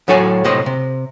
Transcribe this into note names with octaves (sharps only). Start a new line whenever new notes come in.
A2 F#3 A4 C#5 G#5
A2 C3 A3 C5 D#5
C3